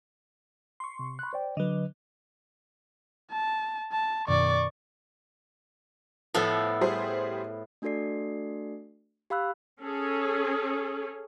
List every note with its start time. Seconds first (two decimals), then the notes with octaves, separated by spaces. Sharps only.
0.80 C6 C#6
0.99 C3
1.19 B5 F#6
1.33 C5 D5 G5
1.57 D3 F#3 B4 D#5
3.32 A5
3.92 A5
4.28 F#2 B2 D#3 D5 C#6
6.34 A2 F3 B3 A4
6.81 G3 G#4 C5
7.82 A3 D4 F#4 A4 D5 C7
9.30 G4 F5 B5 E6 F#6
9.80 C#4 G#4 A4